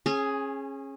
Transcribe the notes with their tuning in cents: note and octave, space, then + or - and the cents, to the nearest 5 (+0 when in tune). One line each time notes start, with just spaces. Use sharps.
C#4 -25 G#4 +5